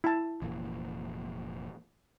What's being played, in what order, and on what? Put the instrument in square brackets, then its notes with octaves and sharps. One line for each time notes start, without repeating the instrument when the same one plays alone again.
[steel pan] E4 A5
[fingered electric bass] F1 A#2 E3